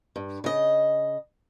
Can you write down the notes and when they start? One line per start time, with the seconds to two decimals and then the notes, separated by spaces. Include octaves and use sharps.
0.16 G2
0.44 C#3 D#5